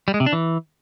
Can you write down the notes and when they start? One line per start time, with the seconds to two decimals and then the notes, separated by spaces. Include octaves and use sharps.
0.08 G3
0.14 G#3
0.20 C3
0.26 D4
0.33 E3